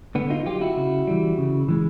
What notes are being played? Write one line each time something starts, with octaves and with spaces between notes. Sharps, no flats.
D3 B3
D#4 F4
F#3 F4 G4
E4 F#4
C#3
E3 G3
C#3
E3 G#3